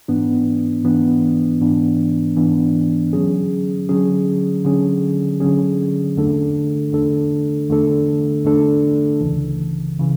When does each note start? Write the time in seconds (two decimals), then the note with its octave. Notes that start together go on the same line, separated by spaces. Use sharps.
0.08 G#2 E3 B3 D4
0.84 G#2 E3 B3 D4
1.61 G#2 E3 B3 D4
2.36 G#2 E3 B3 D4
3.13 D3 F#3 C#4 G#4
3.89 D3 F#3 C#4 G#4
4.64 D3 F#3 C#4 G#4
5.40 D3 F#3 C#4 G#4
6.17 E2 D3 A3 D4 A4
6.92 E2 D3 A3 D4 A4
7.69 E2 D3 A3 D4 A4
8.44 E2 D3 A3 D4 A4
9.21 C#2 C#3 E3
9.99 C#3 E3